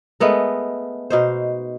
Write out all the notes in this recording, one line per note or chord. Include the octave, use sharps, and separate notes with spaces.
G#3 A3 B3 A#4
B2 D#4 C5